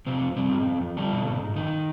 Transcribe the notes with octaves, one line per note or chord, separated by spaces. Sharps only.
F2 C3 C4
F2
C3 G3 C4
G#2
F2
F2
D3 G3 D4
B2
G#2
G#2
F2 D#3 D#4